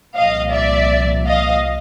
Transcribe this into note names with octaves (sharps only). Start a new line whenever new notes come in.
C2 A#2 F3 D#5 F5
D5 E5
D#5 F5